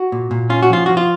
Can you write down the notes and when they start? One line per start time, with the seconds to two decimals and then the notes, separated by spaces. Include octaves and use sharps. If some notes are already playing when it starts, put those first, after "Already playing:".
Already playing: F#4
0.12 A#2
0.31 A#2
0.50 C#4 F4
0.63 F#4
0.70 F3 F4
0.86 F3 F#4
0.97 F4